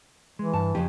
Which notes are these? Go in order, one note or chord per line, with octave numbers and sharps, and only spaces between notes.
E3 G#3
G2 A5
F2 A#2 C#3 G4